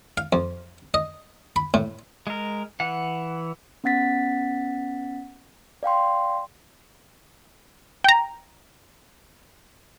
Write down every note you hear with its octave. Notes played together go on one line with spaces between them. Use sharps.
F5
F2
D#5
B5
A2
G#3 A#4
E3 F#5
B3 C#4 F#5 A6 B6
D5 F5 G5 C6
G5 A#5